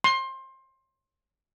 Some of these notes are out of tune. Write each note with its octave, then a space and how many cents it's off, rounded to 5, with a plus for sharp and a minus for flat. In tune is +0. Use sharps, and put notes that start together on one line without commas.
C6 +25